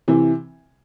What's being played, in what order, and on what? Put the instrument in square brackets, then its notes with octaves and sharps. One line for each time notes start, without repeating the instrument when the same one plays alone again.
[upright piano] C3 E3